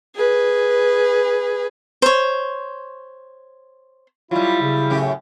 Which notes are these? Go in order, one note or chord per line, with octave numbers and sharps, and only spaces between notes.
G#4 B4
C5 C#5
F#3 G3 E4 F4
C#3
F#2 A2 G4